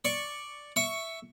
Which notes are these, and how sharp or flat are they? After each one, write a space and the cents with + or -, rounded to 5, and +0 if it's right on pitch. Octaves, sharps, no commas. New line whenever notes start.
D5 +0 C#6 +0
E5 +0 C#6 +10